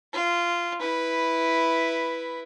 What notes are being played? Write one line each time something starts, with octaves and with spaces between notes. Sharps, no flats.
F4
E4 B4